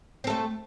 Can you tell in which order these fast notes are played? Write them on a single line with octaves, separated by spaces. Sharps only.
C4 A4 A3